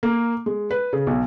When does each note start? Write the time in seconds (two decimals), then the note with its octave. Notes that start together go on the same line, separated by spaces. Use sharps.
0.03 A#3
0.46 G#3
0.71 B4
0.93 C#3
1.07 B1